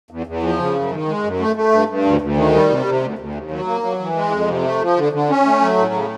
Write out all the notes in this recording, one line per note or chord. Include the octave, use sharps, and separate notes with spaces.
E2
E2
F3
C#3
F#2
D#3
G#3
F#2
A3
A3
G2
G2
D2
D2
D#3
G3
C3
C3
D2
D2
D#2
F#3
A#3
F#3
E3
G#3
F2
C3
A3
F3
D3
D3
C#4
A3
F#3
A2
C#3